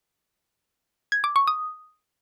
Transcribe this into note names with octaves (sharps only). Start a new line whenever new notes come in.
G#6
D6
C#6
D#6